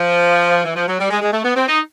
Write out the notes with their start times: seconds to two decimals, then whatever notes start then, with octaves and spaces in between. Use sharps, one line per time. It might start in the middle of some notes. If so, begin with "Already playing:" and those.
Already playing: F3
0.64 E3
0.75 F3
0.87 F#3
0.99 G3
1.10 G#3
1.21 G#3
1.33 A3
1.44 B3
1.56 C4
1.67 D#4